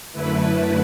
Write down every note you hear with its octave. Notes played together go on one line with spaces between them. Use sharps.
F#2 D3 A3 E4 B4